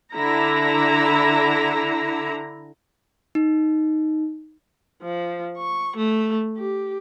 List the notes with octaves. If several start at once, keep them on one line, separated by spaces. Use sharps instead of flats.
D3 E4 A#5
D#4
F3
C#6
A3
G4